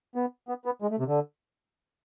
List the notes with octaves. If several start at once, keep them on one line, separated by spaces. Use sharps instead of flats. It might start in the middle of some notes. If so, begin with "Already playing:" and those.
B3
B3
B3
G#3
A3
C3
D3